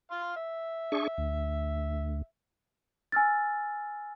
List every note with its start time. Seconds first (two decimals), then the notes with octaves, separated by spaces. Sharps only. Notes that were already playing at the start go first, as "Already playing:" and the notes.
0.11 F5 C6
0.36 E5
0.92 D4 G#4 C#6
1.18 D2
3.12 G#5 E6 F6 A6